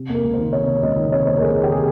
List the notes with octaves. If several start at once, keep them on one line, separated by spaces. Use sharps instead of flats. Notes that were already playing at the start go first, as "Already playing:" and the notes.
Already playing: C3
A#3 A#4
C#2
C5
D#3
C3 C#5
A#3
C#2 D#5
D#3
C3 C#5
A#3 C5
A#4
C#2 G#4
D#3
G4
C3 G#4